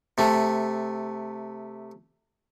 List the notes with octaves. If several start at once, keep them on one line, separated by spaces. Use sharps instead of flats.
C3 A3